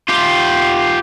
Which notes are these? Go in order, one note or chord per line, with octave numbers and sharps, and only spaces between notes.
F4 G4